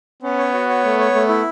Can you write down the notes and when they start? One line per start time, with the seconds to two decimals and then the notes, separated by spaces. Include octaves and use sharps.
0.23 B3 C#4
0.39 C#5
0.54 F#4
0.69 C#5
0.84 A3
0.99 C#5
1.14 A3
1.29 E4